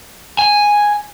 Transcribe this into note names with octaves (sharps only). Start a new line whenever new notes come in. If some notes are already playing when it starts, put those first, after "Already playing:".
G#5